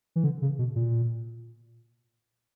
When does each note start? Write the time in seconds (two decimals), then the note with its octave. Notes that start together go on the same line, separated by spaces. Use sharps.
0.16 E3
0.24 D3
0.42 C#3
0.59 B2
0.76 A#2